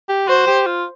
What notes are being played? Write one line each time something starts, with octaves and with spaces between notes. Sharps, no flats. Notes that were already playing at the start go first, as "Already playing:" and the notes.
G4
F#4 C5
G4
F4